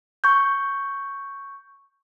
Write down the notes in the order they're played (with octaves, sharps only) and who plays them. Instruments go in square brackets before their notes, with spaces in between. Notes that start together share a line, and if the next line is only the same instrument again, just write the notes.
[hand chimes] C#6 G6